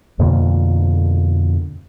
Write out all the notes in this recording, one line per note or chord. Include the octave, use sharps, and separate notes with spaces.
F2 B2 D3 A#3